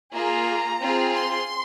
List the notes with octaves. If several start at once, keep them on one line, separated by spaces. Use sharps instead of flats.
A#3 F4 G#4 A#5
C4 F4 G#4
C6